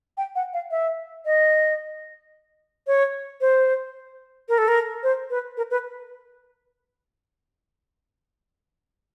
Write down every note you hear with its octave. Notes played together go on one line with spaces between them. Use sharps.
G5
F#5
F5
E5
D#5
C#5
C5
A#4
A4
A#4
C5
B4
A#4
B4